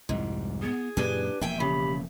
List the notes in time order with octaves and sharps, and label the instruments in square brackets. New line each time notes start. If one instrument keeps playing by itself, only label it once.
[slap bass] C2 F2 G3 [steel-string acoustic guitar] G#2
[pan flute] B3 [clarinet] G#4
[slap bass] F#2 A#2 C#3 [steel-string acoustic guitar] D4 G4 G#5 [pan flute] B4
[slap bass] E1 F3 A#3 [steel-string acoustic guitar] E5 G5 G#5
[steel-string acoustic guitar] C#3 [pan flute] G4 [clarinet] B5